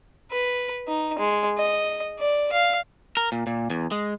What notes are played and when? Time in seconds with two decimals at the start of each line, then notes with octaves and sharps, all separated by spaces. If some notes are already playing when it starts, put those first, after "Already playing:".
0.31 B4
0.88 D#4
1.19 G#3
1.58 D#5
2.20 D5
2.52 F5
3.17 A#4
3.32 A#2
3.47 A#2
3.70 E2
3.92 G#3